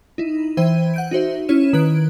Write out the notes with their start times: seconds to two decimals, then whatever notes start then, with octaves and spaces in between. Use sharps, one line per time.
0.18 D#4 E4
0.57 E3 C5 E5 G5 G#6 D#7
0.94 F#5 G6 D7
1.11 D#4 F#4 C5 E5
1.49 C#4 E4 C#5 F6 D#7 E7
1.73 D#3 B4 F#6 G#6 D7